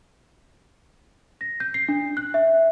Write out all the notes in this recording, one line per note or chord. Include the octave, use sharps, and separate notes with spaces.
A#6
G6
C7
D4
F#6
E5